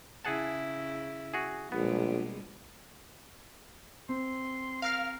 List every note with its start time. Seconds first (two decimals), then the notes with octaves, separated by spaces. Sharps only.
0.25 C#3 E4 G#4 F#5 A5
1.34 F#4 G#4
1.72 A#1 B2 G3 G#3 B3
4.09 C4 C6
4.82 A#4 F5 F6